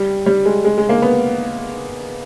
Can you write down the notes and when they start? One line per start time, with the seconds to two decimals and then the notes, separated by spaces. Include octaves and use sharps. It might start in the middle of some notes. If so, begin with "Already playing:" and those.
Already playing: G3
0.26 G3
0.46 G#3
0.65 G#3
0.78 G#3
0.89 A#3
1.02 B3